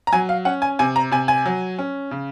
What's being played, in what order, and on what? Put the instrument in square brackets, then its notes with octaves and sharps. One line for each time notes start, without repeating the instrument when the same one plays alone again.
[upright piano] A#5
F#3 G#5
F5
C#4 F#5
G#5
C3 G#5
A#5
C3 G#5
G#5
F#3
C#4
C#3